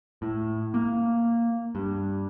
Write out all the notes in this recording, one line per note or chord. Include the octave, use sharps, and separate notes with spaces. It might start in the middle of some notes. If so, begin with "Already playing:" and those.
A2
A#3
G2